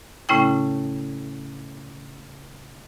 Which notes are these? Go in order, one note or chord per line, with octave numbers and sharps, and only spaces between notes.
A2 C#3 A3 C#4 E4 G5